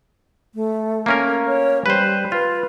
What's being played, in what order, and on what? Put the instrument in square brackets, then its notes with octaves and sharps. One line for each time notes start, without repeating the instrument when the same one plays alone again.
[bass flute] A3
[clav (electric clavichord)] A#3 C#4 A#4
[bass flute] C#5
[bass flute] G3 [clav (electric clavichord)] B4 C5
[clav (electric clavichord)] F4 [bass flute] B4